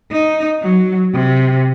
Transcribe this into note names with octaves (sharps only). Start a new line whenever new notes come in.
D#4
F#3
C3